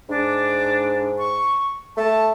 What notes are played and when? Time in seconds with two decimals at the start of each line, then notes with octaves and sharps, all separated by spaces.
0.09 G#2 D4
1.18 C#6
1.97 A3 A5